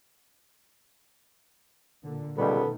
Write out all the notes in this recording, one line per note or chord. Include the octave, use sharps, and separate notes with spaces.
A#2 D3
C#2 B2 D#3 G3 A3 B3 A4